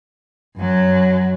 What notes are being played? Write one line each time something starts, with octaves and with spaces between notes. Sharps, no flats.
F#2 F#3